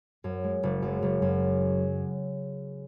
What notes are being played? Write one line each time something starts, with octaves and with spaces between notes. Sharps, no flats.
F#2
G#3
F#1
F#2
F#1
F#2